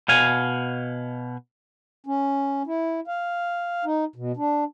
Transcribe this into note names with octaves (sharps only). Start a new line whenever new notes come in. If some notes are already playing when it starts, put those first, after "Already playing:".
B2 F5 G#5
C#4
E4
F5
D#4
B2
D4